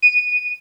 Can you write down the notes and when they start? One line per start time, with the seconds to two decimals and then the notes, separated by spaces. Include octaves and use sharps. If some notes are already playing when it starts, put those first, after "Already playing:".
0.02 D#7